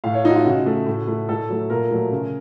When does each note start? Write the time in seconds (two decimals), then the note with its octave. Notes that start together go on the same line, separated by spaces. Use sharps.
0.04 A2 F5
0.14 C#5
0.24 A3 D#4
0.30 F#4
0.35 F4
0.46 C#3 F#4
0.66 A3
0.87 A2
1.08 A3
1.29 A2 A4
1.49 F#3 A3
1.70 A#2 A#4
1.91 F#3 A3
2.12 C#3